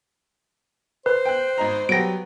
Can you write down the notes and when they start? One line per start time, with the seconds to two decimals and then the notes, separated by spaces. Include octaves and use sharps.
1.06 B4 C5
1.26 G5 F#6
1.58 G#1 D#4 A#5
1.89 F#3 B3 G4 A#6 D7